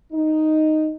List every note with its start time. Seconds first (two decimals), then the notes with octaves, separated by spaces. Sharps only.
0.13 D#4